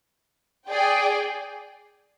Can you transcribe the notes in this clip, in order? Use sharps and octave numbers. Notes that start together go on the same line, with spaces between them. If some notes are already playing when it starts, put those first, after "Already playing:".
G#4 D5 G5